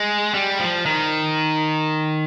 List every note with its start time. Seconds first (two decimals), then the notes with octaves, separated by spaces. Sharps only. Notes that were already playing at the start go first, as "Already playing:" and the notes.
Already playing: G#3
0.34 G3
0.59 F3
0.86 D#3